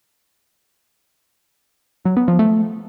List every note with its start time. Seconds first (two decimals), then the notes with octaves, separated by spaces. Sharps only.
2.05 F#3
2.17 B3
2.28 F3
2.39 A3